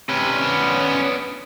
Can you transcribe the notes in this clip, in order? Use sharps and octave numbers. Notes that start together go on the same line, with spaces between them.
C3 C#4 B4
B3 D4